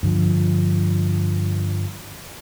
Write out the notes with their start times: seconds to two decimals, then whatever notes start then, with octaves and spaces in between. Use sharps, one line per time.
0.03 G2 D3 F3